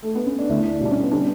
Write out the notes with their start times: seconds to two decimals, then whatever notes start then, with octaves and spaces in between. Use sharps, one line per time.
0.03 A3
0.15 B3
0.26 C#4
0.38 D4
0.50 D2 D3 A3 E4
0.66 D4
0.81 B2 G3 D4
0.91 C#4
1.02 B3
1.12 D3 G3 C#4 D4